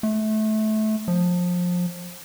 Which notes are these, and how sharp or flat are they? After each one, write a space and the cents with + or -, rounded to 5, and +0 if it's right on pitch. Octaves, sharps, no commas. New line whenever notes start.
A3 -25
F3 +25